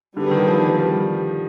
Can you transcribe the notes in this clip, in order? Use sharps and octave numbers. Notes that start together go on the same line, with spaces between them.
D3 G3 B3 E4 G#4 B4
D#3
F3
G3